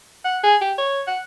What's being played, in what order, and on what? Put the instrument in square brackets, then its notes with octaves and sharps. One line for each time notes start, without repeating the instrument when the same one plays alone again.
[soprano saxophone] F#5
G#4
G4
C#5
F#5